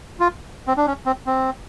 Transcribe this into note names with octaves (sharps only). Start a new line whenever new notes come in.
F4
C4
D4
C#4
C4
C4